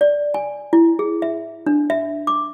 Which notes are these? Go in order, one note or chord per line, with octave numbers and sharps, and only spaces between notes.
D5
G#5
E4
G#4
E5
D4
E5
D6